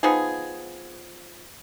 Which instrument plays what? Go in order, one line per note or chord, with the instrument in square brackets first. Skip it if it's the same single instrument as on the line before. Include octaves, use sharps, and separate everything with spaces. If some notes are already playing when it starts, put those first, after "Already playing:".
[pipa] F3 B3 D#4 G#4